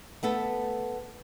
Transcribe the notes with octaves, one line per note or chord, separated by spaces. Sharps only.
A3 B3 A4